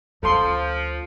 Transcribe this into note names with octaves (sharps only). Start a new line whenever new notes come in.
D2 F3 C#4 A4 C6